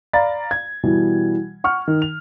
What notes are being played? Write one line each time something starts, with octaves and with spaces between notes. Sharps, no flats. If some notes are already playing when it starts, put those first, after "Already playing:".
D5 F5 A#5 B5 A6
G#6
B2 E3 G3
F#5 C#6 F6
D#3
F7